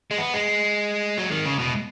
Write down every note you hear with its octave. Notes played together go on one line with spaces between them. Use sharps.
G#3
B3
G#3
F#3
D#3
C#3
B2